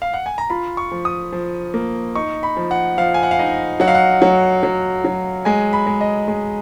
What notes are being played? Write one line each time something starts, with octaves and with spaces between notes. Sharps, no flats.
F5
F#5
G#5
A#5
F4 B5
C#6
F3
D#6
F3
A#3
D#4 C#6
B5
F3
F#5
F3 F5
G#5
F#5
F5
D#4 D#5
F#3 F#5
F5
F#5
F#3
F#3
F#3
G#3 G#5
B5
G#3
D#5
G#3